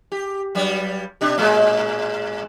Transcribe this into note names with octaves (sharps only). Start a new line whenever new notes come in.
G4
G2 F#3 G3
B2 D4 G4
A2 G#3